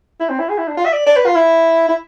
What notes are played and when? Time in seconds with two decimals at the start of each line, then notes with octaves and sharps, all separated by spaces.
0.20 E4
0.29 C4
0.39 E4
0.49 G#4
0.58 E4
0.68 D4
0.77 F4
0.85 E5
0.93 D5
1.07 D5
1.16 B4
1.26 F4
1.35 E4
1.89 E4